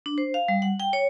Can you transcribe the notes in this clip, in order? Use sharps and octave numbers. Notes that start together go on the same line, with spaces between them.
D4
C5
F5
G3
F#5
G5
C#5